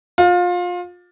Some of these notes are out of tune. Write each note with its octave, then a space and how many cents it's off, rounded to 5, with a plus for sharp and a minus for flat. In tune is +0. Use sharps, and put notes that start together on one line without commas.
F4 +25